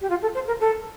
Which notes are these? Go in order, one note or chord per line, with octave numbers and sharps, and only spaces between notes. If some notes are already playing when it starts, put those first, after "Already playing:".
G4
F4
A4
C5
A#4
A4